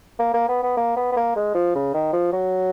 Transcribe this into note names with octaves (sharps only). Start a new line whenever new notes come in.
A#3
A#3
B3
B3
A#3
B3
B3
A#3
G#3
F3
C#3
D#3
F3
F#3